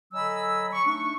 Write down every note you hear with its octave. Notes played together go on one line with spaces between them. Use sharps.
D3 F#3 D#5 G#5 B5 E6
C#6
A3 D4 D#4 C#6